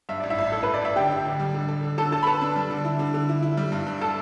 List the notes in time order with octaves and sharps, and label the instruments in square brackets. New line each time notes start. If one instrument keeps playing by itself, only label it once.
[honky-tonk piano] G2 [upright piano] E5
[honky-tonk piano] A1 [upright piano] D5
[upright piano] E4 E5
[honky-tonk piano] A1
[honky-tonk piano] A1 [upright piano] A4
[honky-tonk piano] A1 [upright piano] B4
[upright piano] D5
[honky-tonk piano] A1 [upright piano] E5
[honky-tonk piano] D3 [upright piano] G4 G5
[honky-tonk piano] D3
D3
G3
D3
A4
D3
[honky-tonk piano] D3 [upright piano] A4 A5
[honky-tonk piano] D3 [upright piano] A4 A5
[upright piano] B5
[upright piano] A4 A5 [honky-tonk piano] B4
[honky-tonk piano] D4
G3
D3
E4
D3
D3
E4
E4
G3
G2
G2
[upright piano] A4 A5